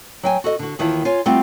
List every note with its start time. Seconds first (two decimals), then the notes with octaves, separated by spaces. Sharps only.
0.23 F#3 G5 G#5
0.44 F#4 A4 D#5
0.59 D3 F#4
0.79 D#2 D#3 E3 E4 F4 A5
1.05 F4 C#5 G#5
1.26 G3 A3 C4 F4 F#5